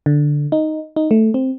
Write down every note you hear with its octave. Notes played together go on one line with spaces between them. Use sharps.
D3
D#4
D#4
A3
C4